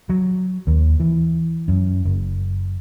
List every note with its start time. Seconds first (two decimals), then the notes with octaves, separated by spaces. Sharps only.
0.09 F#3
0.67 D#2
1.00 E3
1.68 F#2
2.05 F#1